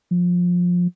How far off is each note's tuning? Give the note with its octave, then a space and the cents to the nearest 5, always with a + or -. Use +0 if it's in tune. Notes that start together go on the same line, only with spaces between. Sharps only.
F3 +20